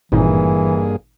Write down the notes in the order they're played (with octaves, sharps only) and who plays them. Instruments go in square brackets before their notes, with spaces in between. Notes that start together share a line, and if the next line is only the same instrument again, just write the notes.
[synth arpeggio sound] G#1 A#2 D#4 [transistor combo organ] G2 A#3 G#4 [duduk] E3